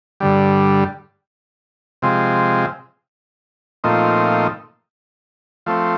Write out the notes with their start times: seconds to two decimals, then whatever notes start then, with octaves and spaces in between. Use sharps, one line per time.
0.20 G2 D3 G3
2.02 C3 F3 G#3 C4
3.84 A#2 F3 A3 C4 D#4
5.66 F3 A3 C4